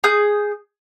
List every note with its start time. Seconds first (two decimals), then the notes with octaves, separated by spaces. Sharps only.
0.04 G#4 D#6 G6